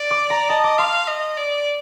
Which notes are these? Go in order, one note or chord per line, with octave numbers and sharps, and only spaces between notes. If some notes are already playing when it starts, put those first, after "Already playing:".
Already playing: D5
D6
A#5
D#5 A5
D6
F5 C6
D#5
D5